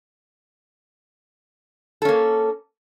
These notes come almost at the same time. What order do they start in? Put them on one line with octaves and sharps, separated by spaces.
A4 C#4 A#3